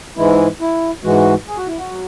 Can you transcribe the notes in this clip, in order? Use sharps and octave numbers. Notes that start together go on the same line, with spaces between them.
G#2 E3 G#3 E4
E4
G#2 E3 G#3 F#4
G#4
F#4
E4
F#4
F#3